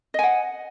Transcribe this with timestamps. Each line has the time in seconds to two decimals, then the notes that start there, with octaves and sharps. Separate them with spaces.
0.14 D#5
0.19 G#5
0.23 F#5